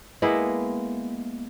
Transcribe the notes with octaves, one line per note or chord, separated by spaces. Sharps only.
G#3 A#3 B3 E4